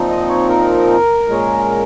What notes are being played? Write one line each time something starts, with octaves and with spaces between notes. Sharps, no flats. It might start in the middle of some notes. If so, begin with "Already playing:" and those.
Already playing: A#2 F3 C4 D#4
D#5
C#5
A#4
A#2 G#3 C#4